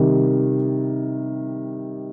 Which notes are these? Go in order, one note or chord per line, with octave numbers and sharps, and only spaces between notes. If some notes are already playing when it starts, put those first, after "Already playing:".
Already playing: C3 D#3 G3